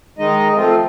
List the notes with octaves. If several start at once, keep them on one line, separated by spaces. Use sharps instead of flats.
D#3 G#3 D#4 D#5
F3 A3 C4 F4